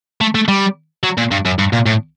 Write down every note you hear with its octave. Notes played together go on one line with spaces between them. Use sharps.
A3
A3
G3
F#3
A#2
G2
F#2
G2
A#2
A2